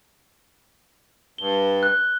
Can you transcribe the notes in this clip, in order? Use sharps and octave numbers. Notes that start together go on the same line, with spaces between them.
G2 G7
F#6